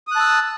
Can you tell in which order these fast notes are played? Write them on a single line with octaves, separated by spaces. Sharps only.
D#6 F#6 A5 E6